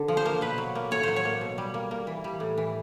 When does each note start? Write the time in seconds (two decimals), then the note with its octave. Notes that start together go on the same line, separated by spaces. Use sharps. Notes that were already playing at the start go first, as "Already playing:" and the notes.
Already playing: D3
0.08 F3
0.17 C5
0.25 A#3
0.41 B2 B4
0.58 F#3
0.75 A#3
0.91 A2 C#5
1.03 F#3 C5
1.16 C#5
1.25 A#3
1.41 B2
1.58 G3
1.74 A#3
1.91 A#3
2.07 E3
2.24 G3
2.40 A2
2.57 E3